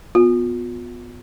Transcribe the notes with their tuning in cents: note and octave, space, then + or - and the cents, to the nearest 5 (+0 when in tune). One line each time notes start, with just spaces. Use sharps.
B3 +0 F4 +35